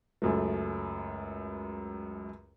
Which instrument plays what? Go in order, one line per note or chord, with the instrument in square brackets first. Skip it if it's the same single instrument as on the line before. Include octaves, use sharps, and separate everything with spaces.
[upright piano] C#2 F#2 A3